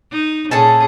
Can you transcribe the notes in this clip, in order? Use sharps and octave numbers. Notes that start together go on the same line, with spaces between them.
D#4
A#2 C#4 G#4 A4 G#5 A5